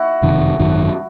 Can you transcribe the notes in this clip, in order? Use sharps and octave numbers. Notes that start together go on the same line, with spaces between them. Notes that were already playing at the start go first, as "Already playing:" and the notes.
Already playing: E4 F#4
F#1 F2 C3 D#3
G#1 F#2 D#3 F#3